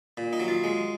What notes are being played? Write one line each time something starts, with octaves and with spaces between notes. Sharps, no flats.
A#2
D#4
F#3
F4
G#3